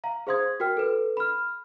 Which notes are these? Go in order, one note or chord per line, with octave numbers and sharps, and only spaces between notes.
F5 A#5
G#4 C5 F5 C6 D#6 G#6
F#4 A#4 G5 F6
A4 B4
B5 F6